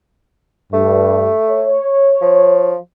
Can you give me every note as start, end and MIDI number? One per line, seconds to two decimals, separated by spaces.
0.73 1.30 43
0.73 1.74 57
1.50 2.72 73
2.21 2.76 53